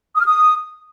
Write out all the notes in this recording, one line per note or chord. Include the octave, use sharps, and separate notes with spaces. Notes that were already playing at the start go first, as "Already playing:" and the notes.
D#6
F6
D#6